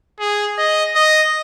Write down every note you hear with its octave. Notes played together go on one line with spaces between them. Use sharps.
G#4
D#5
D#5